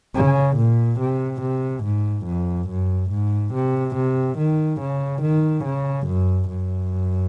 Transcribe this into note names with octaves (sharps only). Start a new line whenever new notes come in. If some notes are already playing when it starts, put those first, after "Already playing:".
C#3
A#2
C3
C3
G#2
F2
F#2
G#2
C3
C3
D#3
C#3
D#3
C#3
F#2
F#2